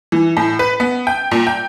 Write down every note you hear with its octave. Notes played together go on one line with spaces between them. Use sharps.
E3
A2
B4
B3
G5
A#2
G5